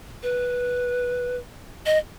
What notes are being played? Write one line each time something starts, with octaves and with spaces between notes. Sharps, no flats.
B4
D#5